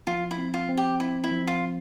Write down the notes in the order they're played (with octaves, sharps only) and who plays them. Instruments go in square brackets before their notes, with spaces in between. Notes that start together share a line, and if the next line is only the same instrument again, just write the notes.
[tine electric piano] F3 [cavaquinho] F4
[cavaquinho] E4
[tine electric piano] C4
[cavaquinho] F4
[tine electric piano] C4
[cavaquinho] G4
[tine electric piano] C4 [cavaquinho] E4
[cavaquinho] E4
[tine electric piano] F3
[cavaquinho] F4
[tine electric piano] C4